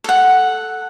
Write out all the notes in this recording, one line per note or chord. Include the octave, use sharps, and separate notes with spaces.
A4 F#5